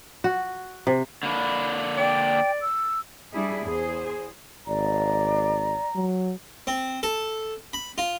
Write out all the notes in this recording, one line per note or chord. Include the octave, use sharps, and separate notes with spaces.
F#4
C3
D3 A#3 D4 B5
D5 G5
E6
G3 D4 E4 G#4
E2 G#4 C5
G#1 D5 A#5
F#3
C4
A4
B5
F4